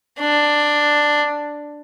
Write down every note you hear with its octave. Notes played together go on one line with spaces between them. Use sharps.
D4